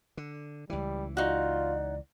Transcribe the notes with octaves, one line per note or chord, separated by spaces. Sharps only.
D3
C#2 E3 G3
D#4 F4 F#4 D5